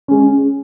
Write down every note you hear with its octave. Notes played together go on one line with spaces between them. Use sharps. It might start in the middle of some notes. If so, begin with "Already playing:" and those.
G#3 C#4